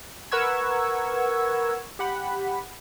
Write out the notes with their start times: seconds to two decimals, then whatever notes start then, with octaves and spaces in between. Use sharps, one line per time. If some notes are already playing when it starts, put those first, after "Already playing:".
0.32 A#4 B4 F#5 C#6 E6 G#6
1.99 G4 F#5 B5